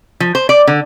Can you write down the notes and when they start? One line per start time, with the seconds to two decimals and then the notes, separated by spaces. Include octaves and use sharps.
0.20 F3
0.35 C5
0.49 D5
0.67 D3